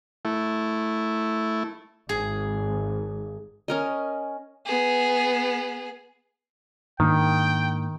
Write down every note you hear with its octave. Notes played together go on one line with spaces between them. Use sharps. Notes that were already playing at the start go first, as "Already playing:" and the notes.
A3 E4
G#1 G#4
C#4 A#4 D#5
B3 G#4
G#2 D#3 A#3 D4 G5